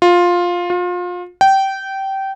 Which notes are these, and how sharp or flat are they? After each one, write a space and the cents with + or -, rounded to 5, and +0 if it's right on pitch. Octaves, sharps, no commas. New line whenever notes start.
F4 +10
F4 +30
G5 -20